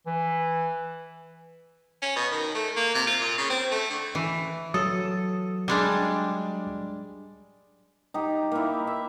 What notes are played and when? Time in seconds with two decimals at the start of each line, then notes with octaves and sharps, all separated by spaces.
0.07 E3
2.02 C#4
2.16 B2
2.32 D#3
2.55 A3
2.76 A#3
2.94 C3
3.07 F4
3.21 A#2
3.38 C#3
3.50 C4
3.72 A3
3.90 D3
4.15 E3
4.74 F#3 A4 D#6
5.68 G3 G#3 D4
8.14 D#4 G4
8.52 A#3 E4
8.87 E5